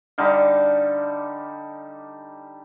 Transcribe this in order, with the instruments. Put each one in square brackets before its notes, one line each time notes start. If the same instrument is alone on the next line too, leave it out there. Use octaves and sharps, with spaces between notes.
[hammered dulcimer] D3 G3 D#4 F5